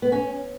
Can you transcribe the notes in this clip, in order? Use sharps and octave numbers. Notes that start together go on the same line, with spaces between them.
B3
C#4